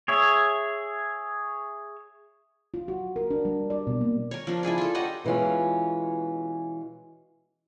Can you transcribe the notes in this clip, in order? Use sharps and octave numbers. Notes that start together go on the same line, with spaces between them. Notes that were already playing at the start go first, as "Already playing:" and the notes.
G#4 C#5 E5
F4
F#4
A#4
D4
G3
D5
B2
A#3
A#4 C#5
F3 D4
E4 F4 G#4 D5
F4 A4
G4 C#5 D#5 F#5
B2 E3 G#3 C#4 F4